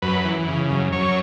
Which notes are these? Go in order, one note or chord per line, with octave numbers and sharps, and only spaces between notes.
F#2 B4
E3
C#3
F#2
F#2 C#5